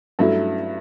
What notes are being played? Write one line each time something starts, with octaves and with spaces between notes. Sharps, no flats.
G2 F#3 A3 E4